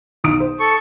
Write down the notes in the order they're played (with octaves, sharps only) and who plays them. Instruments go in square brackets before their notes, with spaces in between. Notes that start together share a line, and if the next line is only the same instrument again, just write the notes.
[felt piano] B1 D#6 D7
C5
[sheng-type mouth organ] A4 C#6